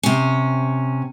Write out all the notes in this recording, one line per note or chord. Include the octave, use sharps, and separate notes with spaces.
C3 C#4